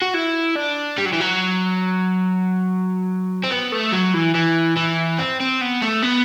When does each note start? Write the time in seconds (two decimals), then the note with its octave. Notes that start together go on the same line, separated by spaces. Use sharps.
0.02 F#4
0.14 E4
0.56 D4
0.98 G3
1.06 F#3
1.13 E3
1.21 F#3
3.44 C4
3.51 B3
3.72 A3
3.92 F#3
4.14 E3
4.35 E3
4.77 E3
5.18 C4
5.40 C4
5.61 B3
5.82 A3
6.02 B3